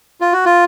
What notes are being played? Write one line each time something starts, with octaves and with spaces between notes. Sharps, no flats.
F4
F#4
F4